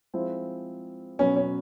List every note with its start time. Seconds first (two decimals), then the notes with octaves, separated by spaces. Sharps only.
0.14 F3 G#3 C4 E4
1.19 B2 F#3 B3 C#4
1.36 C#4